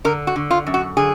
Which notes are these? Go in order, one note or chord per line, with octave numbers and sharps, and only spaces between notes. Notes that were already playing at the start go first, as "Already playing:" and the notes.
D3 A#4
F#4
D3
F4
F#2
F#4
D3 G#4